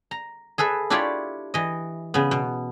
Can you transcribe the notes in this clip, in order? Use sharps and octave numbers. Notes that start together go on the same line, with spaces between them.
A#5
G#4 A4 B4 E5
D4 E4 F4 G4 C#5 D5
E3 D#5
C#3 B3
B2